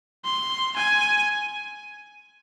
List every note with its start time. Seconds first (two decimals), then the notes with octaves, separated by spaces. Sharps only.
0.25 C6
0.76 G#5